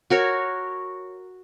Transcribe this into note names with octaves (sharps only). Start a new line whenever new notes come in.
F#4 A#4 C#5